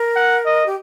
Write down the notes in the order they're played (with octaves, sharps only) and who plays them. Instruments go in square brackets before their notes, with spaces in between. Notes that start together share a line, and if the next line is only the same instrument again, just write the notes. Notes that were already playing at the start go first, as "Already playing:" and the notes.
Already playing: [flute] A#4
[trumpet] F#5
D#5
[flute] G4